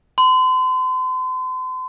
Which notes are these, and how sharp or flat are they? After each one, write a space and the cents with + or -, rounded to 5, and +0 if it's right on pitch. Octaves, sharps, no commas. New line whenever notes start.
C6 -40